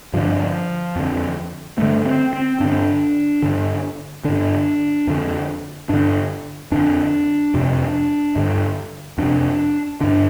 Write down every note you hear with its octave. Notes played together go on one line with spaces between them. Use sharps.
G2 D3 F3
F2 D3
G2 D3 A3
C4
C4
G2 D3 D4
G2 D3
G2 D3 D4
F2 D3
G2 D3 D4
F2 D3 D4
F2 C3
G2 D3
F2 C3 D4
G2 D3 D4